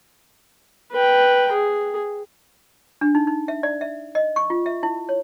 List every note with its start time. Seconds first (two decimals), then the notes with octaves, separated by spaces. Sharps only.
0.92 B4 G5
1.52 G#4
3.01 D4
3.15 D#4
3.27 D#4
3.48 E5
3.63 D5
3.81 E5
4.15 D#5
4.36 C#6
4.50 F4
4.66 E5
4.83 E4
5.09 C#5